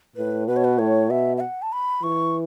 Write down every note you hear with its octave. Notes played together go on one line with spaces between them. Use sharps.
A2 B4
B2 B4
C#5
B4
A2 C#5
B2 E5
E5
F#5
A5
B5
E3 C#6